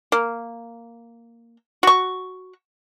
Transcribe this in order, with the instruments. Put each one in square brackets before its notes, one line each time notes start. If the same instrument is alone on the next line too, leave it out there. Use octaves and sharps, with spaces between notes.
[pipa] A#3
F#4 C#6